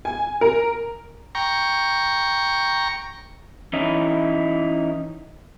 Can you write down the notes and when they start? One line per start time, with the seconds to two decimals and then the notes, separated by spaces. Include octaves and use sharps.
0.05 G#5
0.41 A#4
1.35 G5 A#5 C#6
3.73 E3 C#4 D#4 E4